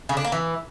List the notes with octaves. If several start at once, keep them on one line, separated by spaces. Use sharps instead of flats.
C#3
D4
A#3
E3